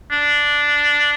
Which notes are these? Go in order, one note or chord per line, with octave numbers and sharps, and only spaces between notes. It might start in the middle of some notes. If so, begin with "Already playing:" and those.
D4